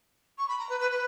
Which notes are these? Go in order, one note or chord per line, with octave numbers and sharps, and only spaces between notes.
C#6
B5
A#5
B4
B4
B4